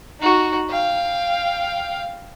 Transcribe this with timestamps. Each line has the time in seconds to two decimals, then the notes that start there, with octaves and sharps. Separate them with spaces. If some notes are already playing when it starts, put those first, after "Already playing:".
0.20 D#4 F#4
0.69 F5 G5